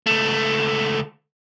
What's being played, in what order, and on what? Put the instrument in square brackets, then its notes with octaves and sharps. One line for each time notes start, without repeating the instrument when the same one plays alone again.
[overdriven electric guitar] C#2 A3